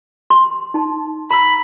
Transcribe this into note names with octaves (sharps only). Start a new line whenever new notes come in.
C6
D#4 A5
A#5 B5 E6